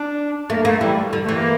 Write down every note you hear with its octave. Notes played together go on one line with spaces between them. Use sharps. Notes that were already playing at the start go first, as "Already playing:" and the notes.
Already playing: D4
A3 A#3
A3 A#3
E3 G3
D3
A3
E3
A#3